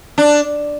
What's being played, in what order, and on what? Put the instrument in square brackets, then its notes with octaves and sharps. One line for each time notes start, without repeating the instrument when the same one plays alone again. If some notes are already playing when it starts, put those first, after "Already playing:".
[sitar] D4